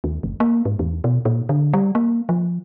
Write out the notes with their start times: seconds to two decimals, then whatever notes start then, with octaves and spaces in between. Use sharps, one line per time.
0.04 D#2
0.23 F#1
0.40 A#3
0.65 G#2
0.79 E2
1.04 B2
1.25 A#2
1.49 D3
1.73 G3
1.95 A#3
2.29 F3